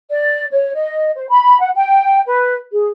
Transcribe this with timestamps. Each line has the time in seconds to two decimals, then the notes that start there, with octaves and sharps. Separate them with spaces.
0.08 D5
0.52 C#5
0.73 D#5
1.15 C5
1.29 B5
1.59 F#5
1.75 G5
2.26 B4
2.71 G#4